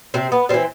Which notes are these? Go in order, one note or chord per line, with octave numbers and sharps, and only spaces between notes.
C3 C4
B3
E3 G3 C4